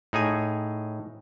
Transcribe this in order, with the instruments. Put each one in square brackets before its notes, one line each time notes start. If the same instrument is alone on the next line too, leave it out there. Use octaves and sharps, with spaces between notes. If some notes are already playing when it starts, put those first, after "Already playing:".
[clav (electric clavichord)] A2 D#4 G#4 G#5